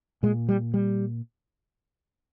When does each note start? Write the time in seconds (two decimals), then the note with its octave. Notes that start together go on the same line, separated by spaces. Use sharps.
0.23 A#2 G#3
0.49 G3
0.74 G3